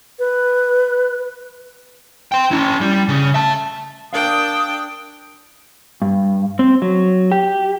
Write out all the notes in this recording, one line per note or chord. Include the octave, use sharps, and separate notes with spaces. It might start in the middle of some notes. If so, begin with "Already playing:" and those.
B4
G5 C6
C#4 E4
G3
C#3
E5 A5
D4 A#4 D5 F5 G5 D#6
G2
C4
F#3
G4